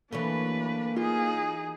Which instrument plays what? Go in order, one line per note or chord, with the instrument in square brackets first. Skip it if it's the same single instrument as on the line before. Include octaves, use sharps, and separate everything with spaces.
[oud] E3 F#3 A3 [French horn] A#3 [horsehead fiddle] D4 B4
[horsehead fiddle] D#4 G#4 [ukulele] F4